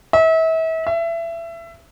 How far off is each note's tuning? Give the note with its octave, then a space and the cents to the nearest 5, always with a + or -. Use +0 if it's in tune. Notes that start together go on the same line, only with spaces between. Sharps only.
E5 -35
E5 +25